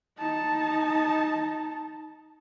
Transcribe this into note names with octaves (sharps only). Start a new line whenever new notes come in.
D#4 A5